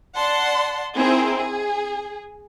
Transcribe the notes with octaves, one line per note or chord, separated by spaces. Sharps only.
D5 F#5 A5 C6
C4 D#4 E4 G#4 A#4 C5
G#4